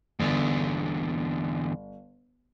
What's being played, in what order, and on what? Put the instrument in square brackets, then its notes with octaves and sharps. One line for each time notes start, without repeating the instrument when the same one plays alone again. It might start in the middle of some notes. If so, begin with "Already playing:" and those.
[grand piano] G1 [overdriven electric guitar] E2 D3